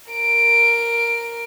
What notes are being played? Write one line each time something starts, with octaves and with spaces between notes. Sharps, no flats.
A#4 D7